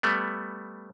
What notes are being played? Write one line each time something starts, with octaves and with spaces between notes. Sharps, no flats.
G3 A3 B3